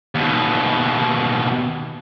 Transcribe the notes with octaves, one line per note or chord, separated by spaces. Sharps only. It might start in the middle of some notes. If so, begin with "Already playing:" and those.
D#2 B2